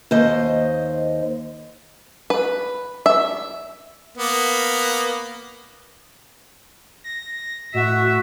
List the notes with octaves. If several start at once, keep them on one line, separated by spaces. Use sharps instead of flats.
D#2 C5 D#5
B4
E5
A#3 B3
A#6
A2 F#4 E5